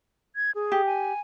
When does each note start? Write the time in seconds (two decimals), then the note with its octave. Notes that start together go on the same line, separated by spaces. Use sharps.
0.36 G#6
0.55 G#4
0.72 G4
0.86 G#5